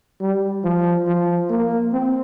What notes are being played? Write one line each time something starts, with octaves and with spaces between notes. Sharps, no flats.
G3
F3
F3
A#3
C4